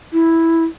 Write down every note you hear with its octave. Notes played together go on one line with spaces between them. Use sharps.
E4